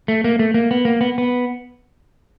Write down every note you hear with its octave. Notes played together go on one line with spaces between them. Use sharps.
A3
A#3
A3
A#3
B3
A#3
B3
B3